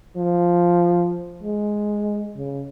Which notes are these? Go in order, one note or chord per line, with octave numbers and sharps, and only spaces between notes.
F3
G#3
C#3